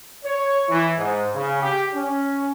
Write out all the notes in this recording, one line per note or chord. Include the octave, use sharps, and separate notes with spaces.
C#5
E3
G#2
C#3
G4
C#4